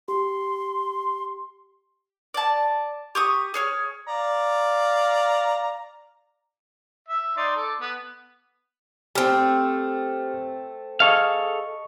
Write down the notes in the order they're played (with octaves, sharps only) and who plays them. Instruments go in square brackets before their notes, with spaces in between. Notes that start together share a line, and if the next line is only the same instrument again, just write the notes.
[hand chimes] G4 [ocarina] C6
[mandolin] D5 A5
G4 C#6 D#6
G#4 C#5 F6
[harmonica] D5 F5 A#5
E5
D#4 D5 C6
A4 D6
B3
[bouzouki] A3 C4 [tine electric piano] G4 F6
[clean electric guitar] G#4 A4 F5 [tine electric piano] D#5 C#6